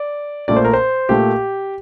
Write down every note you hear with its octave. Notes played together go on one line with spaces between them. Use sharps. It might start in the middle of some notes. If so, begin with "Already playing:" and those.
Already playing: D5
A#2 A3 D5
C5
A#4
C5
A#2 A3 G4